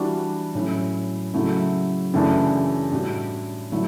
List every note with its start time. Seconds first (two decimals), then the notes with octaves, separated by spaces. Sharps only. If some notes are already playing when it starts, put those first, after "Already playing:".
Already playing: E3 G3 D4 F#4
0.55 A2 F#3 C#4 E4
1.34 C#3 F#3 A3 E4
2.13 F#2 C#3 E3 A3 D4
2.92 A2 G3 D4 F#4
3.72 D3 F#3 A3 E4